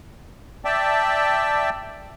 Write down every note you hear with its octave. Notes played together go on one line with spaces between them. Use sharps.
D5 E5 G5 A5